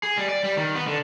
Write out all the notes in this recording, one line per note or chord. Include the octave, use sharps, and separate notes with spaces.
G#4
G3
D5
G3
D#3
B3
D3